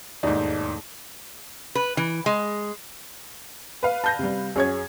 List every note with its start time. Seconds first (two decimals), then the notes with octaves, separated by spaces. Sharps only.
0.23 E1 D#2 G#2 A3 D#4 D5
1.75 B4
1.97 E3
2.26 G#3
3.83 B4 F5
4.04 A5 G6 A#6
4.19 C3 G3
4.56 F#2 G#4 C#5 G#6